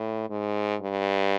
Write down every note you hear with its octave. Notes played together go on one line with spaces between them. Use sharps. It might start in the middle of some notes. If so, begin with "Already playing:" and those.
Already playing: A2
G#2
G2